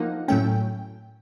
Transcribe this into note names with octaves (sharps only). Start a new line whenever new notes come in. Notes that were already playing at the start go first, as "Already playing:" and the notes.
Already playing: F3 A#3 D#4 F#5
A2 F#3 A3 C#4 G5